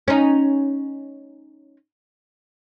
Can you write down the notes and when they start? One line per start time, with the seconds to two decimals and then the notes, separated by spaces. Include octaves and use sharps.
0.08 C#4 D#4